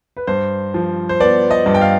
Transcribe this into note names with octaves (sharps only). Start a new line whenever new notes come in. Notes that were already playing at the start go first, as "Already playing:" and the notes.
B4
G2 C5
F3
C5
B3 D5
D#5
G2
G5
F5